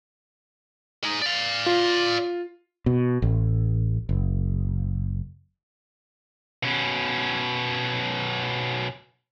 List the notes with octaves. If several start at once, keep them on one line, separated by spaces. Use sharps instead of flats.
G#3 D#4
D5 F5
F4
B2
A1
F#1
B2 C#4